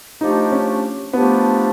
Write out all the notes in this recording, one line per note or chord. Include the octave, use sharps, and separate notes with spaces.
F3 A3 D4 D#4 G4
C#4
F3 A3 B3 D4 G4